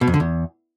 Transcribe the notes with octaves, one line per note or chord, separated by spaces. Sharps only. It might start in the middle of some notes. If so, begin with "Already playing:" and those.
B2
F2
D3
E2